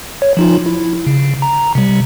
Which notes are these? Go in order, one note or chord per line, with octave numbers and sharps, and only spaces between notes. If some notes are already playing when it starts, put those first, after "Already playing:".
C#5
F3 D#4 F4
E4
C#3
A#5
C3 G3